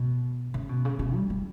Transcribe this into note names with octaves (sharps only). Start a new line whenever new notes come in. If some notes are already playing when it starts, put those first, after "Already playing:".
Already playing: B2
C#3
B2
C#3
B2
G3
G3